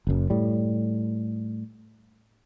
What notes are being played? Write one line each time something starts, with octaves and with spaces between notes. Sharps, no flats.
F#1 F#2
A2 G3